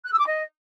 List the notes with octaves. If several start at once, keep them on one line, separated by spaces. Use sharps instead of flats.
F#6
E6
D6
D#5